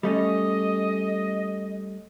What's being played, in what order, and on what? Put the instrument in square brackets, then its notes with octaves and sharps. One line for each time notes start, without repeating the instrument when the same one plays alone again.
[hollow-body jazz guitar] G3 A3 C#4 [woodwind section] D#5